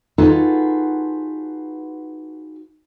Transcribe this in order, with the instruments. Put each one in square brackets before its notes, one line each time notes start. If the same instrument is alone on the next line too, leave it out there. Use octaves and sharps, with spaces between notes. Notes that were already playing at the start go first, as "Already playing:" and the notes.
[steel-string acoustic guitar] D#4 F4 F#4 G#4 A4 B4